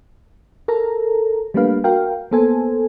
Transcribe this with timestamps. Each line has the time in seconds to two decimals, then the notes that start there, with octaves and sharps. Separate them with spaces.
0.68 A4 A#4 A#5
1.54 G3 A3 A#3 D4 B4 F5
1.84 F#4 A#4 F5 G5
2.31 A#3 B3 A4 C5 G#5